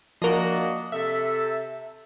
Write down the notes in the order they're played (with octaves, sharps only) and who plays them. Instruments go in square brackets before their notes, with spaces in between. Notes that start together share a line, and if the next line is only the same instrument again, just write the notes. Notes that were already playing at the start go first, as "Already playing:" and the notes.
[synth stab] F3 A#4 [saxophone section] A#3 D4 F#4 [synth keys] D#5
[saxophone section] C3 A4 [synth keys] E5